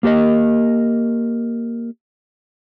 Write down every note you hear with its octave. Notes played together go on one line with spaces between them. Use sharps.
A#3 G4 A#4 D#5